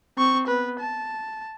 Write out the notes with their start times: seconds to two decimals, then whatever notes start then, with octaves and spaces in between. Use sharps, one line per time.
0.18 C4 C#6
0.48 B3 B4
0.80 A5